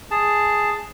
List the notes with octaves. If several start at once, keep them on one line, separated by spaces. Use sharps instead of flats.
G#4 A5